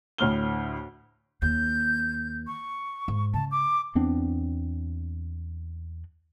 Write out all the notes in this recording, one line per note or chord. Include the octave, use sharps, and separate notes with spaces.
D2 A2 F6 G7
D#2 G6
C#6
G#2
C#3 A5
D6
E2 B3 C4 D4